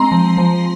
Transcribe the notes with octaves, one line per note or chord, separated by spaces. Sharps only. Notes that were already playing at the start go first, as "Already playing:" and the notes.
Already playing: G#3 C4 A#5 C6
F3
F3